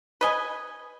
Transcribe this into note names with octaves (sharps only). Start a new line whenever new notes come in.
B4 D#5 G#5